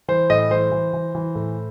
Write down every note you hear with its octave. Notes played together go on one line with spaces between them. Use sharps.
E3 C5
A2 D#5
E3 C5
E3
E3
E3
A2